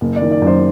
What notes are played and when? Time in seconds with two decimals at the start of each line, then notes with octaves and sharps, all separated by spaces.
0.01 F#1
0.16 D5
0.22 D#3
0.32 D5
0.42 F#2
0.47 C5